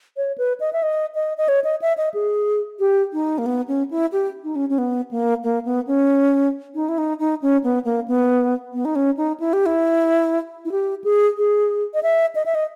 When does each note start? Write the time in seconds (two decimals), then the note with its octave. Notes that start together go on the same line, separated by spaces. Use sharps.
0.17 C#5
0.38 B4
0.60 D#5
0.73 E5
0.83 D#5
1.15 D#5
1.37 D#5
1.48 C#5
1.64 D#5
1.82 E5
1.98 D#5
2.14 G#4
2.80 G4
3.13 D#4
3.38 A#3
3.46 B3
3.68 C#4
3.91 E4
4.12 G4
4.44 D#4
4.56 C#4
4.69 C#4
4.78 B3
5.11 A#3
5.44 A#3
5.65 B3
5.87 C#4
6.75 D#4
6.89 E4
6.98 D#4
7.19 D#4
7.42 C#4
7.64 B3
7.85 A#3
8.08 B3
8.73 B3
8.85 D#4
8.96 C#4
9.17 D#4
9.40 E4
9.53 G4
9.66 E4
10.65 E4
10.72 G4
11.04 G#4
11.38 G#4
11.94 D#5
12.03 E5
12.35 D#5
12.46 E5
12.55 D#5